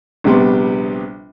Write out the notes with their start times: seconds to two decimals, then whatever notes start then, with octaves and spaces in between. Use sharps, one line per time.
0.24 A#1 C3 G3 B3 G4 C6